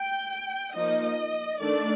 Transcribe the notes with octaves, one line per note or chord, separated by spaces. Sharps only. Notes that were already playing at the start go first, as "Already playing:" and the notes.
Already playing: G5
F3 A#3 D#4 D#5
D#3 A3 D4 D5